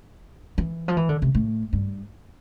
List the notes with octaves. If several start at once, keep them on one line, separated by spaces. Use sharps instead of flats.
E3
F3
E3
D3
C3
A2
G2